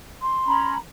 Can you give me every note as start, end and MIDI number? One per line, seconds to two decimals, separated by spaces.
0.22 0.72 84
0.45 0.75 61
0.45 0.75 82
0.45 0.75 83